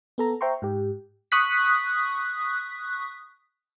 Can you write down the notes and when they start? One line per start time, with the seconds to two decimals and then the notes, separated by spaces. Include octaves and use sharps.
0.18 B3 A4 A#5
0.41 C5 E5 G5 A#5 C6 C#6
0.62 G#2 G4
1.32 C#6 D#6 F#6 B6